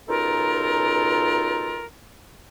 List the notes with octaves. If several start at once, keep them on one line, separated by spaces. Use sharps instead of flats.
C#2 B2 D#4 F4 A4 A#4